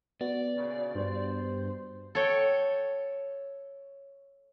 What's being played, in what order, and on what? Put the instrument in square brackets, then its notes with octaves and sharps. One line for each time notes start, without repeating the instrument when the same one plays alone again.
[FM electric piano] B3 F#4 [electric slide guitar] D5
[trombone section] D2 A#2 C#3
[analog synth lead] G2 [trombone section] C5
[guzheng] A4 C#5 G5